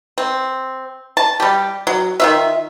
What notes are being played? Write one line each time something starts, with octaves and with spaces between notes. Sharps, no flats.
C4
A5
G3 G4
F#3
D#3 F4 E5